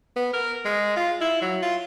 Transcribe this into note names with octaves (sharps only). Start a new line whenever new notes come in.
B3
A#4
G#3
F4
E4
F#3
F4